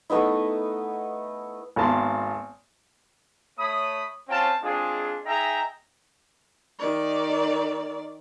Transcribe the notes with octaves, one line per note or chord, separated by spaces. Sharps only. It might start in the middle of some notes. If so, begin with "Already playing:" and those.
A3 B3 D#4 E4
G#1 A#3 B3 A5 C6
A3 C#5 B5 D#6
C4 C#4 F4 F5 G5 A5
G#3 C4 D4 F4 G#4
D#4 G#4 E5 G5 A#5
D#3 D5